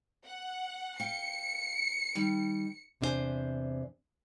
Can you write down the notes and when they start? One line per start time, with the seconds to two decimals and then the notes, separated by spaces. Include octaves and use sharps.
0.26 F#5
1.00 F5 G5 C#7
2.15 D#3 G3
3.01 E2 C3 D4 F4 C5 G#5